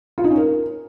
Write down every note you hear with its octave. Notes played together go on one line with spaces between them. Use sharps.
F4
D#4
C#4
A#4